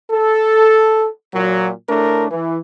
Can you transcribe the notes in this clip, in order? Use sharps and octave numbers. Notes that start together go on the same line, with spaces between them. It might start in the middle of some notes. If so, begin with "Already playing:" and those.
A4
A#2 F#3
A2 A3 D4 A#4
E3